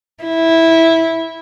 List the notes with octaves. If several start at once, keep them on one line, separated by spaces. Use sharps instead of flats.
E4